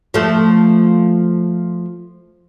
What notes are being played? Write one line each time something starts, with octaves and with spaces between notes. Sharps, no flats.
F3 A3